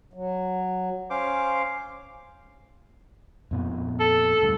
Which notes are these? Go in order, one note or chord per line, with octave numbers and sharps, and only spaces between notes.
F#3
C#4 C5 F5 D6
F2 A#2 B3
A4
D2 G2